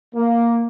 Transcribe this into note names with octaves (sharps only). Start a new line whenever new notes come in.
A#3